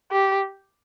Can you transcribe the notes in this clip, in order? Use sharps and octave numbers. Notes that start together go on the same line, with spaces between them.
G4